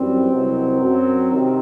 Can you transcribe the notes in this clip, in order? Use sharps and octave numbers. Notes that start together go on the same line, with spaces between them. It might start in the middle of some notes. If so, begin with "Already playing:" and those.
Already playing: F#2 E3 G3 C4
C2 B2 F#3
F#2 F#3
C3 D#3